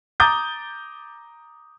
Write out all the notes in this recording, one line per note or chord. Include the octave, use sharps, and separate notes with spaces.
A#5 D6 D#6 G6 A6